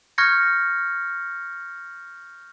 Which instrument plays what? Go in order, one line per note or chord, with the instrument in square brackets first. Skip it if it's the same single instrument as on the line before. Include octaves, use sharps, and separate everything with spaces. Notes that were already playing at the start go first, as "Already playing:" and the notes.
[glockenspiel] C#6 F6 G6 G#6 A#6 C#7